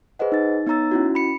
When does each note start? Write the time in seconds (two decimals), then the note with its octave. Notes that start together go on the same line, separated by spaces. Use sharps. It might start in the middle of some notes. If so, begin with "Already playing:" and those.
0.19 G#4 B4 C5 D#5 F#5
0.32 D#4 A6
0.67 B3 D#4 C#5 A#5 E6 A6
0.91 C#4 E4 F#4
1.15 B5 C#7